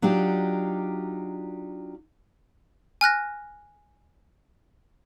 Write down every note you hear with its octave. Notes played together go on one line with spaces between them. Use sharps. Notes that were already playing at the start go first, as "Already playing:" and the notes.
F#3 D4 D#4 F4 G4
G#5 F6 F#6 A#6